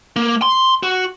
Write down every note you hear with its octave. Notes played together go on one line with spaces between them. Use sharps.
A#3
C6
F#4